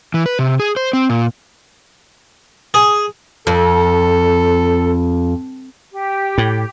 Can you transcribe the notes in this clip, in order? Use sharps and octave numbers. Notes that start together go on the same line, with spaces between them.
E3
B4
C3
G#4
C5
C4
A#2
G#4
F2 A4
G4
A2